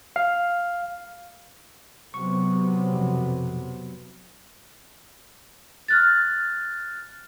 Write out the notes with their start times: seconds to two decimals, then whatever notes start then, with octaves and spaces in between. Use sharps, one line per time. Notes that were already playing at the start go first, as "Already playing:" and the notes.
0.16 F5
2.14 C3 F#3 B3 C#6
2.93 F2 B2
5.88 F6 F#6 A6